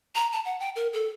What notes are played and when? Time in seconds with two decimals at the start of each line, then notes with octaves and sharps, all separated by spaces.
0.15 A#5
0.32 A5
0.45 F#5
0.60 G5
0.76 A#4
0.93 A4